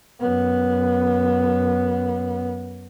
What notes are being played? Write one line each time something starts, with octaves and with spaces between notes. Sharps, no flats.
F#2 B3